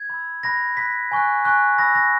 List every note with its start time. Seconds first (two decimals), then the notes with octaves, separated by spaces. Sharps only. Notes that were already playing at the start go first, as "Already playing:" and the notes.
Already playing: G#6
0.10 B5 E6
0.43 B5 F#6 A#6
0.77 B5 F#6 B6
1.12 G#5 C#6 F#6
1.45 G#5 C#6 F#6
1.78 B5 E6 A#6
1.95 A#6